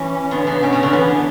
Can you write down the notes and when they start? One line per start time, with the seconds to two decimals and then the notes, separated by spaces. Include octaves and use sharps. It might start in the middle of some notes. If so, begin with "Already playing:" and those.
Already playing: E3 C#4
0.31 D3 B3
0.47 C#3
0.63 B2 C#4
0.73 C#3
0.83 D3
0.92 E3 B3